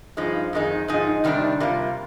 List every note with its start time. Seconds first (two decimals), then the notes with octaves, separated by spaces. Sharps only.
0.17 G2 F3 G#3 D#4
0.53 F2 D#3 G#3 D#4
0.88 G#2 F3 D#4 G#4
1.24 C3 D#3 G3 D4
1.60 C3 G3 A#3 F4